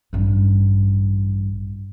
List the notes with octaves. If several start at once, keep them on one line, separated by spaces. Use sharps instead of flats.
A1 G2